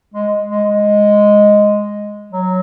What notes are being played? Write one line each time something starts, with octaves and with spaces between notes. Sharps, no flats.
G#3
G#3
G#3
F#3